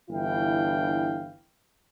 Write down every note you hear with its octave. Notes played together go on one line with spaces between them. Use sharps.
G1 E3 D4 E4 F5 G5